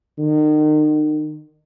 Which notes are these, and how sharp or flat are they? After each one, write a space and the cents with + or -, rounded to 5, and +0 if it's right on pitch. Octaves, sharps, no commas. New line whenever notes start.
D#3 -35